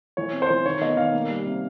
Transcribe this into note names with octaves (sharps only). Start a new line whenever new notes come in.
E3 C#5
C4
C5
E3
D#3 C#5
B3 D#5
D#3 F5
A#3
G3
C3